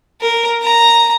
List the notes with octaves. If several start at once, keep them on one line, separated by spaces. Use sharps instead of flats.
A#4
A#5